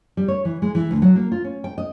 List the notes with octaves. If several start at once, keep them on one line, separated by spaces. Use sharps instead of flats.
G3
C#5
E3
G#3
E3
D2
F#3
A#3
F4
C#4
G5
D#5